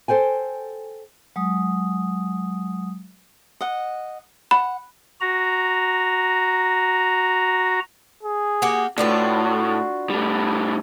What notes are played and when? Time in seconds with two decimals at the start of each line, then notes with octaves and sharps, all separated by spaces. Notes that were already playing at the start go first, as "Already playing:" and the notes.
0.08 A4 C5 G5 G#5
1.36 F#3 G#3 D#6
3.61 D#5 F#5
4.51 F#5 B5
5.21 F#4 A#5
8.23 G#4
8.62 A#3 F#4 G4
8.98 A2 D4 F4 F#4 B4
10.10 A2 G3